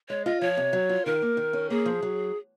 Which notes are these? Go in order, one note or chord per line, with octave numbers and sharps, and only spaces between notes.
G#3 C#5
F4 D#5
F3 C#5
C3
F#3
F4
D#3 A#4
A#3
D#3
C#4
A#3 G#4
F3
F#3